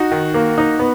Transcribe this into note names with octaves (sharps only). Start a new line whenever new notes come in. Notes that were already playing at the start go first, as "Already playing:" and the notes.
Already playing: D#4 F#4
D#3
A#3
D#4
B3